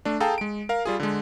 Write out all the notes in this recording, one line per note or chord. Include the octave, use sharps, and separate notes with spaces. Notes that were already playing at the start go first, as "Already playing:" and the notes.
A3 D4
G#4 A4 F5 G5 A5 A#5
G#3 D7
A#4 F5
G3 F4 G#4
D3 G#3